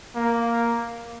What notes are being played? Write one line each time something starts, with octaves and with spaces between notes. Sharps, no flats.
A#3